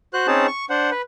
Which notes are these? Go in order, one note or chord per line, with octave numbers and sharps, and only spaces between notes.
F#4 C5 F#6
C4 C#4 D#4 G#4 A5
C#6
D4 C5 F#5
B4